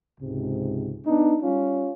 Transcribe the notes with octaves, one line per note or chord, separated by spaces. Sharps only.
C#2 G#2 C3
B3 D4 D#4
G3 C#4 F4